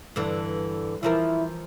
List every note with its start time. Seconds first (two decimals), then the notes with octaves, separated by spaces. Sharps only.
0.16 G2 D3 E3
1.03 E3 F3 E4 A#4